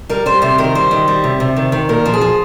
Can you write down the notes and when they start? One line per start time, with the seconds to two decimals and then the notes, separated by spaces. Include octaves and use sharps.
0.09 G3 A#4
0.26 G3 C5
0.42 C3 C5
0.58 D#3 A#4
0.75 G3 C5
0.91 D#3
1.08 G3
1.24 C3
1.40 C3
1.56 D#3
1.72 D#3
1.89 A#2 A#4
2.06 F3
2.14 G#4
2.21 F3